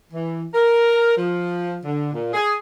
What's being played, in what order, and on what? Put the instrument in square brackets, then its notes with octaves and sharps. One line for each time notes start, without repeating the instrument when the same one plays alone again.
[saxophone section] E3
A#4
F3
D3
A#2
G#4